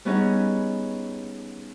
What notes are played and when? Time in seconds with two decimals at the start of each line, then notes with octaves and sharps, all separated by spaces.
0.05 G3 B3 C#4 D#4 G#4